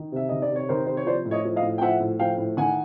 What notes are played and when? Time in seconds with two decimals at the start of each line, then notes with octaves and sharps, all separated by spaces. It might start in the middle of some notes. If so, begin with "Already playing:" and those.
Already playing: D#3
0.12 C3 E5
0.29 D#3 D#5
0.42 D5
0.50 C3
0.56 C#5
0.69 D#3 A#4 C5
0.87 C3 C5
0.97 C#5
1.06 F3 C5 D5
1.25 A2
1.31 C#5 D#5
1.45 F3
1.56 D#5 F5
1.63 A2
1.78 G5
1.81 F3 E5 F#5
2.00 A2
2.19 F3 F5 G5
2.38 A2
2.57 D#3 F#5 G#5